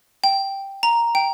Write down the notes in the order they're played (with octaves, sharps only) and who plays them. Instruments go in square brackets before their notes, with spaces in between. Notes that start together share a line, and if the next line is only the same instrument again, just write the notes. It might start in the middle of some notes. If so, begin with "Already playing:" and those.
[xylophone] G5
A#5
G5